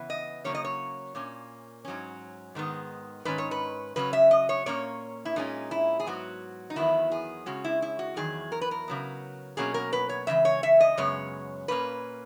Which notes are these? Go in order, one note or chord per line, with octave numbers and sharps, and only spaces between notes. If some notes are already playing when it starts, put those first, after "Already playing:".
Already playing: C#3 E3 B3
D#5
C#3 F#3 A#3 C#4 C#5
D#5
C#5
A#2 A#3 C#4
G#2 F#3 C#4
G#2 D#3 G#3 B3
G#2 D#3 C#4 B4
C#5
B4
C#3 F#3 C#4 B4
E5
D#5
C#5
A#2 A#3 C#4 C#5
E4
A#2 G#3 C#4 D#4
E4
G#4
G#2 F#3 B3 F#4
D#4
E2 D#3 F#3 B3 E4
G#4
C#3 G#3 C#4 F#4
E4
E4
F#4
E2 D#3 F#3 G#4
A#4
B4
A#4
C#3 F#3 B3
B2 F#3 A#3 C#4 G#4
A#4
B4
C#5
C#3 E3 G#3 E5
C#5
E5
D#5
F#2 C#3 G#3 B3 C#5
A#2 A#3 C#4 B4